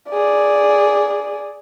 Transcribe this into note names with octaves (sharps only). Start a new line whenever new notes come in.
G#4 D5